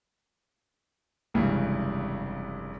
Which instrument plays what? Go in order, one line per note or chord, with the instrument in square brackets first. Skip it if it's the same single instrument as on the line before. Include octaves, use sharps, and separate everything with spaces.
[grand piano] F1 C#2 G2 E3